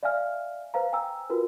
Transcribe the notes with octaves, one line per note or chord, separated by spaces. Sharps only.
D5 E5 F5 G#5 F6
B4 C5 F5 A#5
G5 G#5 A#5 E6
F4 F#4 A#4 B4